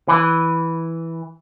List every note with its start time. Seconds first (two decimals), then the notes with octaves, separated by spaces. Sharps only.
0.08 E3